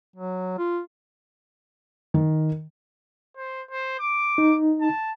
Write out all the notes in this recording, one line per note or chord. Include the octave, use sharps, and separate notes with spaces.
F#3
F4
D#3
C5
C5
D6
D#4
A5